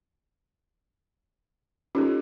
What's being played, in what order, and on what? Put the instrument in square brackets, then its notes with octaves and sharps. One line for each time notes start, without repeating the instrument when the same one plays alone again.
[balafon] C#4 D#4 [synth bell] F4 G4 A4